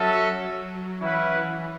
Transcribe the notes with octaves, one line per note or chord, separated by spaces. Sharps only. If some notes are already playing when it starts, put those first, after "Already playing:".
Already playing: F#3 C#4 F#4 A4 E5
E3 C#4 E4 B4 F#5